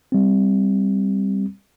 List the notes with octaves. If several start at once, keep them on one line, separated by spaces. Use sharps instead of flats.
G3 C4